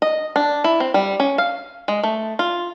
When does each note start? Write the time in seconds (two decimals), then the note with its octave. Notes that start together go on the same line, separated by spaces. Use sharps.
0.02 D#5
0.36 D4
0.64 E4
0.80 C4
0.94 G3
1.20 C#4
1.38 F5
1.88 G#3
2.03 A3
2.39 F4